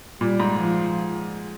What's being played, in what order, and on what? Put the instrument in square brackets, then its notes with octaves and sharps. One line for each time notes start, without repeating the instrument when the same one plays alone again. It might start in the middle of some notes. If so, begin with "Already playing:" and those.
[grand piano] A#2 [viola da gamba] G3
[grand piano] G#2
[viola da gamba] F3